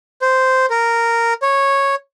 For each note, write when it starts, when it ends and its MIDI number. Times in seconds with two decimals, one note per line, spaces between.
0.22 0.66 72
0.70 1.34 70
1.42 1.95 73